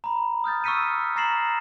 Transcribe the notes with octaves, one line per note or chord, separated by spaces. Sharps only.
A#5 B5
D#6 F6 G6 A6
C#6 E6 F6 B6 C#7 D#7
A#5 A6 A#6 C7 E7 F#7